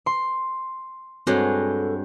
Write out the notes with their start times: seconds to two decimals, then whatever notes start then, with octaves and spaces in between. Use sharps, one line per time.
0.06 C6
1.27 G2 G#3 C4 F#4 A4 C#5